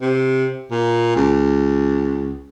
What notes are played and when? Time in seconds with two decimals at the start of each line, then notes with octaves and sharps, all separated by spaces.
0.01 C3
0.71 A#2
1.16 C#2